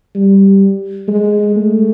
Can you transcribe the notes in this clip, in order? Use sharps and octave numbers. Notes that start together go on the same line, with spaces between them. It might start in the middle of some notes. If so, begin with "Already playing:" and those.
G3
G#3
A3